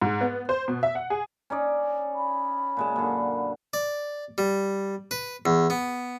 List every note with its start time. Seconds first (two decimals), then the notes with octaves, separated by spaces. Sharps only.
0.02 G#2
0.21 B3
0.49 C5
0.68 B2
0.83 E5
0.95 F#5
1.10 G#4
1.50 C#4 D#4 D5
2.15 B5
2.77 A#2 G#3 A5
2.96 F#2 D3
3.73 D5
4.38 G3
5.11 B4
5.46 E2
5.70 B3